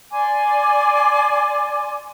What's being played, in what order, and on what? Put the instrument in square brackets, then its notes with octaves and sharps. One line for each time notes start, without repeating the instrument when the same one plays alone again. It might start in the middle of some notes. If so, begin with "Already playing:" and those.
[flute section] D5 G#5 C6 D6